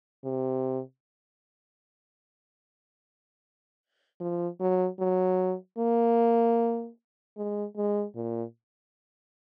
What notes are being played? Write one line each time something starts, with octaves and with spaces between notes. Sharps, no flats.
C3
F3
F#3
F#3
A#3
G#3
G#3
A#2